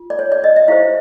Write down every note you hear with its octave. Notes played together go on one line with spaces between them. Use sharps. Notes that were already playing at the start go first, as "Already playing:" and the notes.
Already playing: F4
D5
C#5
D5
D#5
E5
E4 G4 C5 F5